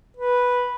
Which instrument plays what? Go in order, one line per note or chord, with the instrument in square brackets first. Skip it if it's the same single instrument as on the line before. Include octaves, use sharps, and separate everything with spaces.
[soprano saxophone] B4